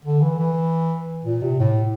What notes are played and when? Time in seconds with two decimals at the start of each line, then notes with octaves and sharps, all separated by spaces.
0.05 D3
0.22 E3
0.39 E3
1.25 A#2
1.42 C3
1.59 A2